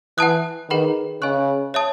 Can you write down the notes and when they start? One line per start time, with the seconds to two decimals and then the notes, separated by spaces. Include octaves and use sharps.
0.18 E3 F#5 A5 D#6 F#6
0.69 D#3 G#4 B4 F#5 B5
1.22 C#3 D#5 G#5 C#6 F#6
1.74 C#5 E5 A5 D#6